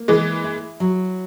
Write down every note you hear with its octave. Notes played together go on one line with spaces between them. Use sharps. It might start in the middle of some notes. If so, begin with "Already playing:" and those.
Already playing: A#3
E3 G#3 G#4
E4
F#3